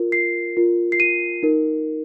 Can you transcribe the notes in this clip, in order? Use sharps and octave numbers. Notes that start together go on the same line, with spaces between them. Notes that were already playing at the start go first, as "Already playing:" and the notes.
Already playing: F4 A#4
C7
F4 A#4
C7
D#7
D#4 A#4